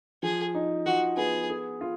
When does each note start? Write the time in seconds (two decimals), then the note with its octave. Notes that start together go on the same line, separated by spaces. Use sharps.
0.23 F3 G#4
0.55 D#4
0.86 F3 F#4
1.17 B3 G#4
1.49 G#4
1.81 F4